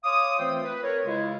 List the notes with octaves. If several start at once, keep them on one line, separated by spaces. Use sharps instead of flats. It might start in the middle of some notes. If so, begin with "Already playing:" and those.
C#5 F5 C6 D6 D#6
E3 A3 C4 F4 C5 G5
B4
A#4 B4 C#5
C#3 G#3 E4 F4